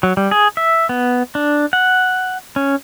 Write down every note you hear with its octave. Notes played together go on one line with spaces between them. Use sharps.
F#3
G3
G#4
E5
B3
D4
F#5
C#4